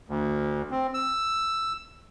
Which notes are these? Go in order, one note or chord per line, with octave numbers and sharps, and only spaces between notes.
D2
C4
E6